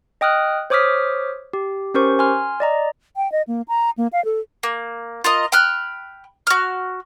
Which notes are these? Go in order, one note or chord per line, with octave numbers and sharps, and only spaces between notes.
D#5 G5 D#6 F6 F#6
C5 C#5 D6 D#6 F6 B6
G4
C#4 G4 A#4 C5 C#6
G#5 C6 F6
D5 D#5 A#5
G5
D#5
A#3
A#5
A#3
F5
A4
A#3
F4 A#4 D#5
G5 B5 F6 F#6
F#4 F6